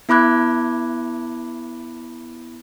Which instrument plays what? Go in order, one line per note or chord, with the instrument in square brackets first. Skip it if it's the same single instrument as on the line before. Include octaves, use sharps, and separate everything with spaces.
[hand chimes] B3 E4 B5 D6 F#6 G#6